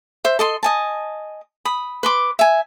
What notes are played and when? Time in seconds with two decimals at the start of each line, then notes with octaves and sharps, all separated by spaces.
0.25 C5 E5
0.39 A4 D#5 C6
0.63 D#5 G#5 A5
1.65 B5 D#6
2.03 B4 C6 D6
2.39 E5 G#5